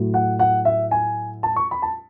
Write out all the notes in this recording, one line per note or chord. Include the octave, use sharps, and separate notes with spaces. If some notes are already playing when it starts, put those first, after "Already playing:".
Already playing: A2 F#3
F#5
F#5
E5
G#5
A5
C#6
B5
A5